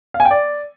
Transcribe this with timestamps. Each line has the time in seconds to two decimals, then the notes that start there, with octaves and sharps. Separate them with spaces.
0.14 F5
0.20 G#5
0.25 G5
0.31 D5